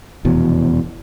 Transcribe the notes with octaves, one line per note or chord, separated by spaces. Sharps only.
F1 E2 B2